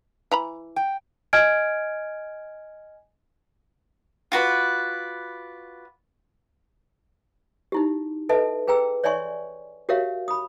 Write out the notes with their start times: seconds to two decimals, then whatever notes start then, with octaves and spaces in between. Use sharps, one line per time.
0.31 E3 A#5 B5
0.76 G5
1.33 D#5 G#5 F6 G#6 D7
4.32 F4 F#4 B4 D5
7.72 D#4 E4 G4
8.29 A4 B4 D#5 E5 A5
8.67 G#4 B4 G5 A#5 E6
9.04 C#5 D5 E5 G#5 C6 C#6
9.89 F#4 G4 A#4 C#5 E5 F5
10.28 B5 D#6